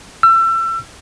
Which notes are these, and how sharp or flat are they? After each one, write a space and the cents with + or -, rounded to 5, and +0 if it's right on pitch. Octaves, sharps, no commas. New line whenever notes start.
E6 +30